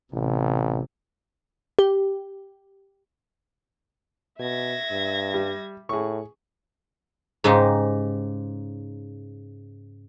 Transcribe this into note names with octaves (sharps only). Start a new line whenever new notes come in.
A1 C3
G4
B2 E5 G#6 A#6
G2
G3
A2 G#4 C#6
G#2 C#3 G#3 D#4 G4